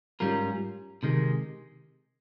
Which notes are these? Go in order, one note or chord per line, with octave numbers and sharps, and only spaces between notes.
G#2 G3 C#4 F4 A#4
C3 D#3 G#3